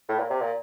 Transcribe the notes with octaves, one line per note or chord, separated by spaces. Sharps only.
A2
A#2
C3
A#2